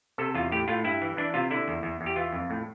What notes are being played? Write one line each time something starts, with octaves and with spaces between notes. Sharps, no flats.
C3 A4
E2 F4
A2 G4
A2 F4
G2 E4
E3
E3 D4
C3 F4
D3 E4
E2
E2
E2
G4
E3 F4
F2
A2